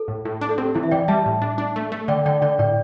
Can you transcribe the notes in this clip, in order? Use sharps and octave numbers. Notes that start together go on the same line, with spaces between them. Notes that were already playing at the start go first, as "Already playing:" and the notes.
Already playing: A4
A2
A2
D4
A4
C4 G4
E3 E4
E5
E3 D5 G5
G3 E5 A5
A2
D4
D4
A3
A3
D3 D5 G5
D3 D5 G5
D3 D5 G5
A2 D5 G5